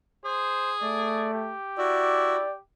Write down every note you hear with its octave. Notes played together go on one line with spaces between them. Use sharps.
G#4 C5
A3 D5
G4
E4 F#4 D5